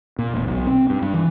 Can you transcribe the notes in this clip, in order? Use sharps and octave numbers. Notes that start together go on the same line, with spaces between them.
A#2
E1
B1
C4
G2
G2
E3